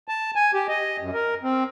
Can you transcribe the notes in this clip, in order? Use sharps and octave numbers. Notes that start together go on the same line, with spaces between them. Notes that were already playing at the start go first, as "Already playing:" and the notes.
A5
G#5
G4
D#5
F#2
A#4
C4